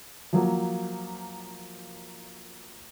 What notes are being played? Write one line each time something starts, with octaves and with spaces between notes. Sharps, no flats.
F3 F#3 A#3